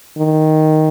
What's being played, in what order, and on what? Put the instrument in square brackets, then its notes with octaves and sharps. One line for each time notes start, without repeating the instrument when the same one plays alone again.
[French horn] D#3